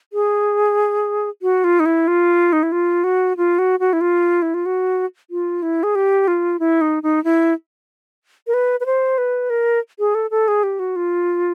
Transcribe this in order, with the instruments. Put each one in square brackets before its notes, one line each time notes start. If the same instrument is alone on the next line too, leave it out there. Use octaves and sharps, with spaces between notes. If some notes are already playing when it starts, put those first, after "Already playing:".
[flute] G#4
F#4
F4
D#4
E4
F4
D#4
E4
F4
F#4
F4
F#4
F#4
E4
F4
E4
F4
F#4
F4
E4
G#4
G4
F4
E4
D#4
D#4
E4
A#4
B4
B4
C5
B4
A#4
G#4
A4
A4
G#4
G4
F#4
F4